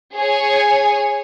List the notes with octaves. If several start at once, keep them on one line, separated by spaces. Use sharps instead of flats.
G#4 C#5 G#5